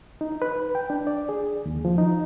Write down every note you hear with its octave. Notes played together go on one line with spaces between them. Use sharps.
D#4
B4
G5
D4
D5
G#4
D#2
F3
D#4